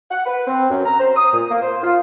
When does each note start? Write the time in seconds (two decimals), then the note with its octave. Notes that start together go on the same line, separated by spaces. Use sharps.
0.11 F#5
0.26 B4
0.47 C4
0.70 F#2
0.85 A#5
1.00 C5
1.16 D#6
1.33 A#2
1.51 A#3
1.62 C5
1.83 F4